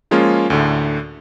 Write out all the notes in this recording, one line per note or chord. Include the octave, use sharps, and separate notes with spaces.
F3 G#3 A#3 C#4 F4
D2 A2 D3